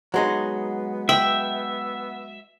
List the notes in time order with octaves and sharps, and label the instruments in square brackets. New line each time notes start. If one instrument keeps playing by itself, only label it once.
[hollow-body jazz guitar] F#3 G#3 D#4 [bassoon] B3
[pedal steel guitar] E5 [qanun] G5